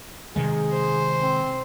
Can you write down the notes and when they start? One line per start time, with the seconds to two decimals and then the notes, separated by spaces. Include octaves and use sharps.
0.36 C3 D#3 G#3 G#4
0.72 C5
1.22 C4